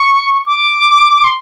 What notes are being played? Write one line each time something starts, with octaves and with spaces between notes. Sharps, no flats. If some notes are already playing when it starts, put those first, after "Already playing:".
Already playing: C#6
D6
C6